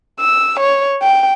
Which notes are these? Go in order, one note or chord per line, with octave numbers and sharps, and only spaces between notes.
E6
C#5
G5